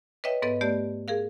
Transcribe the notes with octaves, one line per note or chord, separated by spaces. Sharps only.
B4 C#5 D#5 E5 G5
G#2 B3 A4 B4 D#5
A3 B3 G4 D5
G#4 A#4 F5